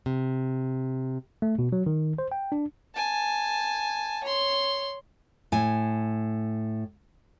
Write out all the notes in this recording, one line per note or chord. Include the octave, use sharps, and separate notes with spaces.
C3
A3
B2
F#3
D#3
C5
G5
D4
G#5 A5
C#5 C6
A2 G#5